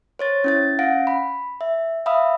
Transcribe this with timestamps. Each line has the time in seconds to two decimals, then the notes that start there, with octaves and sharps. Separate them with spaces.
0.19 C5 C#5 A6
0.44 C#4 E4 A6
0.79 C#4 F5 F#5 A#6 D7
1.07 B5
1.61 E5
2.06 E5 F5 B5 D#6 E6